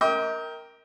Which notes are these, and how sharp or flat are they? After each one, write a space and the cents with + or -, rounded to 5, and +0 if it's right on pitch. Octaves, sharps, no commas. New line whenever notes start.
A#4 +0 D#5 +40 G5 +0